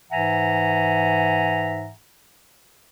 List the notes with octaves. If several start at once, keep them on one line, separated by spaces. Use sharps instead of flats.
G#2 E3 E5 F#5 G#5 A#5